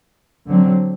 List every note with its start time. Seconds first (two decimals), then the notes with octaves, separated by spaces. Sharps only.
0.46 D3 F#3 C4